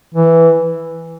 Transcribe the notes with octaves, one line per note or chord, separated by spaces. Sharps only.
E3